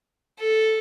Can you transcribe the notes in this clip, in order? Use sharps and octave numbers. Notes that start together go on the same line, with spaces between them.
A4